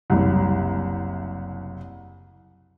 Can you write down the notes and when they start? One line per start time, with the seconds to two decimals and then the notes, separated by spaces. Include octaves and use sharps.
0.10 F#1 C2